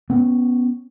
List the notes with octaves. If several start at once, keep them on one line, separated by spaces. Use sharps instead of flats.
B3 C#4